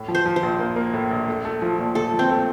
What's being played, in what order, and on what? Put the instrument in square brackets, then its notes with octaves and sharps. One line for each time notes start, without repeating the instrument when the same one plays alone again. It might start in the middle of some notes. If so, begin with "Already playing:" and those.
Already playing: [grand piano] A2
F3
[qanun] C5
[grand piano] F3
[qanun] C5
[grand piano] A#1
A#3
A#3
A2
A#1
A3
A3
F3
A#2
[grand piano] A3 [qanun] A4
[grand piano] F3
[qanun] C4
[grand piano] A3